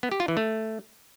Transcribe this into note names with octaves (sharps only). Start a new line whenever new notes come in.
B3
G4
F4
E3
A3